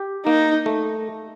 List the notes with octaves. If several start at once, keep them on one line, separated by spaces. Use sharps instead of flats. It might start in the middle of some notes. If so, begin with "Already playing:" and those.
Already playing: G4
A#3 D#4
A3